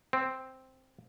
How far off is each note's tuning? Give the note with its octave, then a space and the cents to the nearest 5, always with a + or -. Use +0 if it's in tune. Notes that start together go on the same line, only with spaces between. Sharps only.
C4 +0